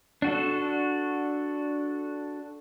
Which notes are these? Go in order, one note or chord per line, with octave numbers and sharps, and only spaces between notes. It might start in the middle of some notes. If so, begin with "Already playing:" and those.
D4 F#4 A4